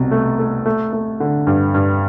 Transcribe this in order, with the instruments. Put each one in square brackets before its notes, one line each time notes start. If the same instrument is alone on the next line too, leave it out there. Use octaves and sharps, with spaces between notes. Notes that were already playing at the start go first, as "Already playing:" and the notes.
Already playing: [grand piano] C2 B2
A3
A3
A3
A3
D3
G2
G2